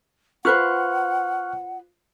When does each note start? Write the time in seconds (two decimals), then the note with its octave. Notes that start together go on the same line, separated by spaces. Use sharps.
0.45 F4 B4 C5 F#5 C#6 F6 F#6